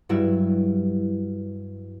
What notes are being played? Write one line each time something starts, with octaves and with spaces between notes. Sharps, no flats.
G2 F#3 G3 E4